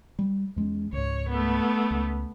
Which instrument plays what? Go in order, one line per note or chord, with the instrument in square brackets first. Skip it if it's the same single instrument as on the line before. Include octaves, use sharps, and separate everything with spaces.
[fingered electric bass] G3
E2 G#3 C#4
[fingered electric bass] C#2 G#2 [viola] C#5
[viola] A3 B3
[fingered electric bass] C#2